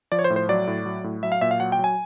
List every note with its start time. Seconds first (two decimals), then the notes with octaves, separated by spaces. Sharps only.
0.12 F3 D5
0.19 C#5
0.24 C5
0.30 A2
0.36 C5
0.49 F#3 D5
0.67 A2
0.85 F#3
1.04 A2
1.23 F#3 E5
1.32 F5
1.41 A#2 E5
1.51 F5
1.60 F#3 F#5
1.72 G5
1.79 F#3 G#5